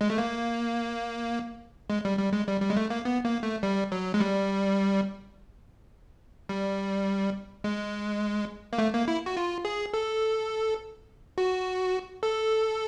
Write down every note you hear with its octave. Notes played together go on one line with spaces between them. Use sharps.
G#3
A3
A#3
G#3
G3
G3
G#3
G3
G3
G#3
A3
A#3
B3
A#3
A3
G3
F#3
G#3
G3
G3
G#3
A#3
A3
A#3
E4
F#4
F4
G#4
A4
F#4
A4